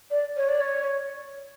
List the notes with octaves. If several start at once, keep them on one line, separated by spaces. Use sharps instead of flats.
D5
C#5
D5
C#5